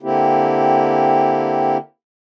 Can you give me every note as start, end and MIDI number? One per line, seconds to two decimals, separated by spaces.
0.03 1.77 50
0.03 1.77 58
0.03 1.77 60
0.03 1.77 64
0.03 1.77 67